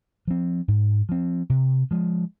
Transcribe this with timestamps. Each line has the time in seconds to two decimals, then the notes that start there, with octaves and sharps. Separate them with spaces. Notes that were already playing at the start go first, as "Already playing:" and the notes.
0.27 F3 C4
0.68 G#2
1.09 F3 C4
1.50 C3
1.91 F3 G#3